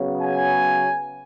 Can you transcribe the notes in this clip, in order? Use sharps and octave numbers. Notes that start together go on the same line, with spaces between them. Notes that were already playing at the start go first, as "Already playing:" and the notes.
Already playing: C#3 F#3 B3
G#5